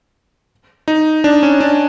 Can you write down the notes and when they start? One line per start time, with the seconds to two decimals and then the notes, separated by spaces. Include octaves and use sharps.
0.88 D#4
1.24 D4
1.43 C#4
1.60 D4